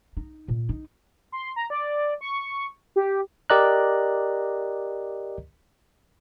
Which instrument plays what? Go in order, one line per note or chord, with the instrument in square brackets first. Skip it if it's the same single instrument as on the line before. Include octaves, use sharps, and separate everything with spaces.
[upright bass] D#4
A#2
D#4
[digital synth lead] C6
A#5
D5
C#6
G4
[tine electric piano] G4 A#4 D5 D#5 A#5 F#6